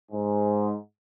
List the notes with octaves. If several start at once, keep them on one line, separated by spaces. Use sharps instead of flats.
G#2